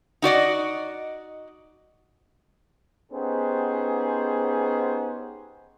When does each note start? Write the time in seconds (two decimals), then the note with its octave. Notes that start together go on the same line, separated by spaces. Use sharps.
0.22 D#4 F#4 D5 D#5
3.12 B3 C#4 D#4 G4 G#4 C5